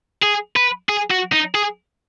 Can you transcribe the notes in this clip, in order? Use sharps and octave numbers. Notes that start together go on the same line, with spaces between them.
G#4
B4
G#4
F#4
D#4
G#4